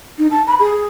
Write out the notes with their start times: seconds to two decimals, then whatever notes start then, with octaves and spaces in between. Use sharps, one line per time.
0.18 D#4
0.30 A5
0.47 B5
0.59 G#4